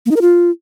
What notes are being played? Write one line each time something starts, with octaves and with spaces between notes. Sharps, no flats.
A#3
D#4
A#4
F4